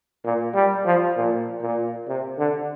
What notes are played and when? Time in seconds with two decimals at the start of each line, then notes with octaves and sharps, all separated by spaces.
0.24 A#2
0.54 G3
0.86 F3
1.17 A#2
1.62 A#2
2.08 C3
2.38 D3